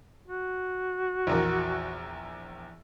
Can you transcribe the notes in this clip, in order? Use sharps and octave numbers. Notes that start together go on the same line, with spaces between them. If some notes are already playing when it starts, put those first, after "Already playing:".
F#4
A#1 E2 A#4